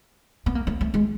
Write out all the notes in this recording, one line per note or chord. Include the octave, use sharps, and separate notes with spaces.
B3
A#3
A3
A3
G#3